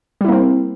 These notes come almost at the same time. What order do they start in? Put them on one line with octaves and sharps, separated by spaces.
G3 E4 A#3 C4